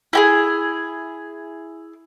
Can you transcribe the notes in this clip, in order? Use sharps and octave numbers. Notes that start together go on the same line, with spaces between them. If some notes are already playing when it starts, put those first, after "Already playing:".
E4 G4 G#4